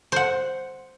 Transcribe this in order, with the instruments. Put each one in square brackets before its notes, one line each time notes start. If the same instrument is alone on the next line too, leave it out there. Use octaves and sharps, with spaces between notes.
[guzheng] C5 F#5